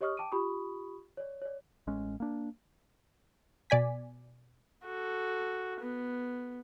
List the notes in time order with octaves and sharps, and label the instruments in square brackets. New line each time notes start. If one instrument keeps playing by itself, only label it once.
[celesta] G4 C#5 D#5 C#6 D#6 F6
G5 A5 D6 D7 D#7
F4 G4 B5 C#6 D#6
C#5 D5
C#5 D5
[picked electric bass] A1 G#3 C#4
A#3 D4
[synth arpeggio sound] B2 D5 G#5 B6
[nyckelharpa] F#4 A4
B3